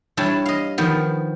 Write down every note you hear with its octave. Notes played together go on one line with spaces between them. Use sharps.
G3 D4 E4 C#5 A5
D#5 F5
D#3 F3 B3